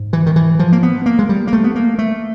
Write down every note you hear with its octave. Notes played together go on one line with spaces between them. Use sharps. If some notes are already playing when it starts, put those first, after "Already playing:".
Already playing: G#2
E3
D#3
E3
F3
A#3
B3
A#3
G#3
G3
A#3
A3
B3
A#3
A3